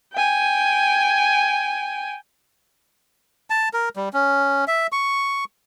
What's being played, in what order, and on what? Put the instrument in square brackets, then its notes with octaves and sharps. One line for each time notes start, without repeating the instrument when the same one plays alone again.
[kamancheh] G5 G#5
[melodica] A5
A#4
G3
C#4
E5
C#6